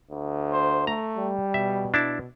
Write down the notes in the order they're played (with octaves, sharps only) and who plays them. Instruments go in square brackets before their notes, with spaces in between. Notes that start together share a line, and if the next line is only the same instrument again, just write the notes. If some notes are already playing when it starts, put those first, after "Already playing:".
[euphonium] D2
[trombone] C5
[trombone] A3 [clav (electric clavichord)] A#5
[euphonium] G3
[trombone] B2 [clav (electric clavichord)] E5
[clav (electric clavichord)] D4 E4 A5